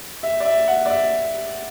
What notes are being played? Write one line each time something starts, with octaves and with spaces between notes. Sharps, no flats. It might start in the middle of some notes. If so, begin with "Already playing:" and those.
E5
D5
E5
F#5
D5
E5